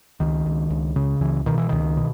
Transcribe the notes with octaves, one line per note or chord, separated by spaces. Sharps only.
C#2 D#3
C#2
C#2
C#3
C#2 E3
B2 D#3
E3
C#2 D#3
B2